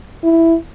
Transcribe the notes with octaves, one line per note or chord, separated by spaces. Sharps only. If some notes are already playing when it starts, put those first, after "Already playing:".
E4